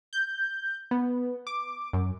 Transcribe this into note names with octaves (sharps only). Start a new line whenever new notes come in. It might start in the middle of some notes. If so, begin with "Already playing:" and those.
G6
B3
D6
F#2